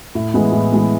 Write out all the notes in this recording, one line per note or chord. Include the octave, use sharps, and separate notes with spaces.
A2
E3 G#3 B3
A2
E3 G#3 B3